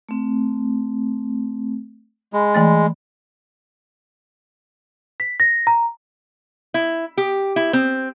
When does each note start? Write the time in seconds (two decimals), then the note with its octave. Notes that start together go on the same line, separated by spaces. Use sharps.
0.09 A3 C4
2.33 G#3 B5 C6
2.54 E3 A3 A6
5.20 B6
5.40 A#6
5.67 A#5
6.74 E4
7.17 G4
7.56 E4
7.73 C4